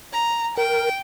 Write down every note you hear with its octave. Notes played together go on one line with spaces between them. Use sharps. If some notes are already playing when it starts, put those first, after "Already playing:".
A#5
A#4 G5